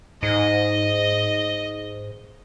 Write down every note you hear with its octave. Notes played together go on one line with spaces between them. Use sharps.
G#2 D#5